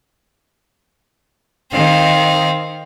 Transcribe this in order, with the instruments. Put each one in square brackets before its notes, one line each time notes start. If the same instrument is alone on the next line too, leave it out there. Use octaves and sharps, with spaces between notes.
[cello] D#3 [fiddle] C4 F5